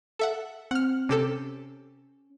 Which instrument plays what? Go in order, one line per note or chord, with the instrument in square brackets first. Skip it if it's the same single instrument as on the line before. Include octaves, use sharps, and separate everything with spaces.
[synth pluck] A4 E5 F#5
[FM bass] C4 [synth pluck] F#5 F6
[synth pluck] C3 G4 A4 [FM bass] C#4